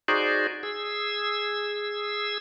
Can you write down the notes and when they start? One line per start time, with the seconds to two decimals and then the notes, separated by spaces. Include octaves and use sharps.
0.08 D#4 F#4 G#4 C5 D5
0.63 G#4 E6